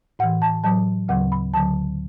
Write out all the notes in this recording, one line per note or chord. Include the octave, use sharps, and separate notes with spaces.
A2 E3 F#5
A5
A2 F#3 A5
D2 C#3 F#3 F#5
B5
D2 D3 F#3 A5